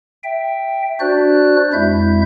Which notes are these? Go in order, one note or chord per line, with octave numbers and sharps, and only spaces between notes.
E5 G5
D4 F#4 C5 D5 F#6
F2 G#3 E4 E5 G6